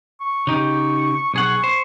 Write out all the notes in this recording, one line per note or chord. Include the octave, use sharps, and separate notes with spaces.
C#6
C#3 D#4 G4
B1 G#4 F#5 C#6
C5